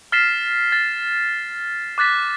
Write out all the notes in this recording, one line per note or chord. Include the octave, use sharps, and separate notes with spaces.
F6 A6 B6 C7 E7
A6
D6 F#6 A6 B6